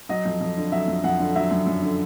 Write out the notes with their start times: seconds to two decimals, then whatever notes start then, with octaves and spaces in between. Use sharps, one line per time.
0.09 F#3 D#5
0.25 F2
0.41 F2
0.57 D3
0.72 F#3 E5
0.88 F2
1.04 F2 F#5
1.19 D3
1.35 F#3 E5
1.51 F#2
1.67 F#2
1.82 D3